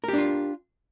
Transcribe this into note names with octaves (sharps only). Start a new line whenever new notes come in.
D4 F4 G4 A#4